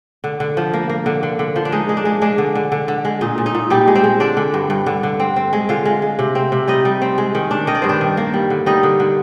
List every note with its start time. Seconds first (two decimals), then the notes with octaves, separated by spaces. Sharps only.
0.24 D3
0.40 D3
0.57 F3
0.73 A#3
0.89 A#3
1.06 D3
1.23 D3
1.39 D3
1.56 F3
1.65 D4
1.72 G#3 D#4
1.89 G#3
1.97 D4
2.05 G#3
2.22 G#3 D4
2.38 D3
2.55 D3
2.72 D3
2.88 D3
3.05 G#3
3.21 A#2 D#4
3.38 A#2
3.46 D#4
3.55 A#2
3.70 A#2 G3 G4
3.87 G#3
3.95 C4 C5
4.04 G#3
4.20 D3 D4 D5
4.37 D3
4.54 G2
4.70 G2
4.86 D3
5.03 D3
5.20 C4
5.36 C4
5.53 G#3
5.69 D3 F4 F5
5.85 G#3
6.02 G#3
6.19 C3
6.35 C4
6.52 C3
6.68 G3 D#4 D#5
6.85 G3
7.02 C4
7.18 G#3
7.35 D#3
7.51 D4
7.67 D#3 D#5
7.75 D5
7.82 G2 C5
7.89 D4 D5
8.01 D#3
8.17 A#3
8.34 G3
8.50 D3
8.66 G3 D#4 D#5
8.83 D3
9.00 D3